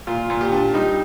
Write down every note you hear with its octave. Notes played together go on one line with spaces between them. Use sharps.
A#2 F4
A#2
G4
D4
G3 D#4